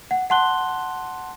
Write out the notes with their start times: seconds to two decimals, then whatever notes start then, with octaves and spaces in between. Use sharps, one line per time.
0.11 F#5
0.30 F#5 A5 C6 F#6 G7